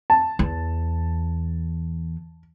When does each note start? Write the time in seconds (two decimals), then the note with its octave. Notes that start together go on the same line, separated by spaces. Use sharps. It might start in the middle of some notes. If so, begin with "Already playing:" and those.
0.10 A5
0.39 E2